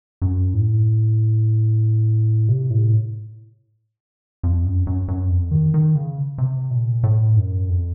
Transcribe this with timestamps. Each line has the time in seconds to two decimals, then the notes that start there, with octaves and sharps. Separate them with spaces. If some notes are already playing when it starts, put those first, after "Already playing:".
0.22 F#2
0.54 A2
2.49 C3
2.70 A2
4.43 F2
4.65 F#2
4.87 F#2
5.08 F#2
5.30 F2
5.51 D#3
5.74 D#3
5.95 C#3
6.38 C3
6.71 A#2
7.03 A2
7.36 F#2
7.69 F2